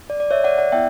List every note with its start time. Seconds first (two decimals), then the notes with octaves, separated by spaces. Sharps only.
0.10 D5
0.20 D5
0.31 C#5 E5
0.44 D5 F#5
0.58 D5 F#5
0.72 B3 E4 E5 G5